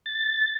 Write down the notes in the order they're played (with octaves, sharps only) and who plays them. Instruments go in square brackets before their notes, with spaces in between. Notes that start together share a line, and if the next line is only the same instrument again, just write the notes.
[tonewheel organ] A6